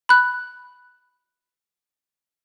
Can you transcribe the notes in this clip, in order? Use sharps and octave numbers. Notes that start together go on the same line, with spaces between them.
B5 F#6